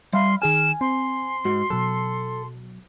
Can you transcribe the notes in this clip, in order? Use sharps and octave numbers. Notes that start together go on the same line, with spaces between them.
G3 E5 F5 B5 C6
D#3 G#4 G#5 F6 E7
C4 C6
G#2 F#4
B2 F#3 A4